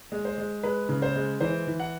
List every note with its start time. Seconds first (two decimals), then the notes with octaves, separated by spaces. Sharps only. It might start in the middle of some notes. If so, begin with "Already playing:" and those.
0.12 G#3
0.25 C5
0.38 G#3
0.63 G#3 B4
0.89 C#3
1.02 C5
1.16 G#3
1.41 E3 C5
1.67 E3
1.80 F#5